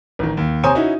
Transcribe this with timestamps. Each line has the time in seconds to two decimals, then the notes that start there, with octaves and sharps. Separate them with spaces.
0.19 A1 D#3
0.37 D#2
0.63 C3 C5 C#5 G#5 A#5 D#6
0.75 C#4 D#4 E4 F#4